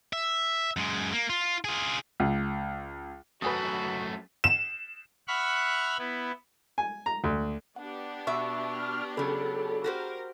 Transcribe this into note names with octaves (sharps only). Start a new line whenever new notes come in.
E5
F#2 G#3
A#3
F4
F4 G#4
C#2
F#2 A3 F#4 B4 G#5 D#6
E7
E5 F#5 B5 C#6 F6 F#6
B3 E4
G#5
A#5
D2
B3 D4 G4 F#5
B2 E5 C#6 E6
F6
C#3 F#3 G#4 A4 B5
F#4 G4 A#4 C5